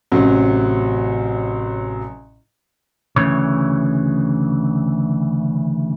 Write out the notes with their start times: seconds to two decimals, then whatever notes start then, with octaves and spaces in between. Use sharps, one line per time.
0.12 A1 C3 F#3
3.16 D2 C#3 E3 C#5